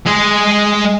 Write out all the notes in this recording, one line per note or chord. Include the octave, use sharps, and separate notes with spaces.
G#3 G#4